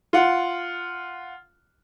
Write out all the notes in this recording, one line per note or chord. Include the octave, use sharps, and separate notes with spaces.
F4 F#5